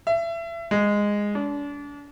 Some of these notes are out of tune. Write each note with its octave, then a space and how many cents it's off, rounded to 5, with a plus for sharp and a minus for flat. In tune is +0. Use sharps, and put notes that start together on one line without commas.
E5 +30
G#3 -10
D4 -35